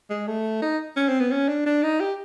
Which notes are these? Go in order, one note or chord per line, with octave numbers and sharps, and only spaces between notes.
G#3
A3
D#4
C#4
C4
B3
C#4
D4
D4
D#4
G4